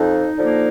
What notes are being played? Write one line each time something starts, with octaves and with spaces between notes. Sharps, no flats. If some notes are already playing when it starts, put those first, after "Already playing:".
Already playing: F2 D#4
D3 F3 A#3